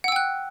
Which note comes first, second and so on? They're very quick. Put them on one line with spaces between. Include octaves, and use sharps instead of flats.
F#5 E6 G5 F#6